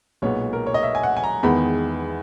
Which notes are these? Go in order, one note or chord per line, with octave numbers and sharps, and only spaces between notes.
B1 A#2 G#3 B3 C#5
A#4
C#5
D#5
E5
G#5
F#5
G#5
A#5
E2 D#3 G#3 B3 B5